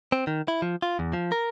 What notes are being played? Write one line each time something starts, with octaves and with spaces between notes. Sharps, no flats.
C4
D#3
E4
F3
F4
E2
F3
A#4